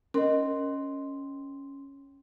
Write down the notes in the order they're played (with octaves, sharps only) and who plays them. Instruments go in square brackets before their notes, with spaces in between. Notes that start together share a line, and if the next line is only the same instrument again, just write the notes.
[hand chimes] C#4 C6 [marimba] A#4 D#5